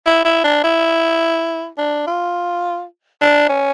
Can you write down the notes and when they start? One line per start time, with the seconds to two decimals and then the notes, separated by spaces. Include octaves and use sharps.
0.06 E4
0.25 E4
0.44 D4
0.64 E4
1.78 D4
2.07 F4
3.22 D4
3.50 C#4